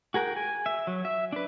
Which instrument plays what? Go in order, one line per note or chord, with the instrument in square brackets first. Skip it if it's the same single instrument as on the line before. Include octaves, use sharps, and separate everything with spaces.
[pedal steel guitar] F#4 G#4 A#4 F#5 G5
G#5
E5
F#3
E5
D4 B4